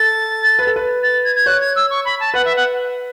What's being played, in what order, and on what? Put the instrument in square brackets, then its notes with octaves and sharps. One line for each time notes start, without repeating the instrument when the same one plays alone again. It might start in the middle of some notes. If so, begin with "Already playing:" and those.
Already playing: [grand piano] A4 [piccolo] A6
[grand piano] B4
A4
B4
[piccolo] A6
G#6
G#6
[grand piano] C#5 [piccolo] F#6
[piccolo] G#6
E6
C#6
B5
A5
[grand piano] B4 [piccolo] F#5
[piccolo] E5
F#5